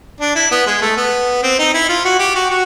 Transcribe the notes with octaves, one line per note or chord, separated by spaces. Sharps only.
D4
E4
B3
G#3
A3
B3
C4
D#4
E4
F4
F#4
G4
F#4
F#4